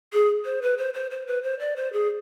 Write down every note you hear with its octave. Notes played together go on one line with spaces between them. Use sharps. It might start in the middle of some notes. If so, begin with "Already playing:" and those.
G#4
C5
B4
C5
C5
C5
B4
C5
D5
C5
G#4